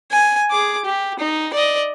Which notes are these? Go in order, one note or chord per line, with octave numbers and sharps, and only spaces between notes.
G#5
G#4 D6
G4
D#4
D5 D#5